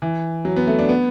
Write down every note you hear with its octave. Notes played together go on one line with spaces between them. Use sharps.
E3
F#3
B3
A3
D4
B3